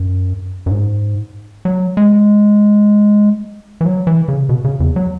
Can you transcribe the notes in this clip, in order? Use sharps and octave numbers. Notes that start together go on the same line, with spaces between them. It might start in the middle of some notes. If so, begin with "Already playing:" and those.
Already playing: F#2
F#2
G#2
F#3
G#3
E3
F#3
E3
C#3
B2
C#3
E2
F#3